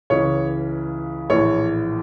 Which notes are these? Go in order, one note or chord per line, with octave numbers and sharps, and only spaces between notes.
C#2 C#3 E3 C#5
A#1 A2 E3 C#5